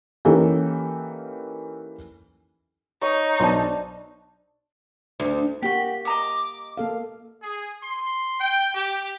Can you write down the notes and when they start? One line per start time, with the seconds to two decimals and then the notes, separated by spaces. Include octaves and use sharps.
0.25 E3 A#3 C#4 D#4 G4 A4
3.02 D#4 C#5 D#6
3.40 B1 D4 C5 A5
5.20 D2
5.62 A#3 F#4 G4 G5 B6
6.05 D#5 A#5 D6 D#6
6.77 A#3 A4 F5
7.43 G#4
7.83 C6
8.41 G5
8.75 G4